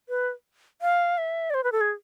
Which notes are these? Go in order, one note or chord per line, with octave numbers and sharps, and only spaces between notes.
B4
F5
E5
D5
C5
B4
A4
G#4